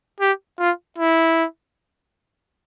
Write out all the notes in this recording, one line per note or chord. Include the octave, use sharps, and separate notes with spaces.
G4
F4
E4